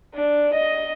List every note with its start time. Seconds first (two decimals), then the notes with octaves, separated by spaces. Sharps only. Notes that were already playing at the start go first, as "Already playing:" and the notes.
0.14 D4
0.54 D#5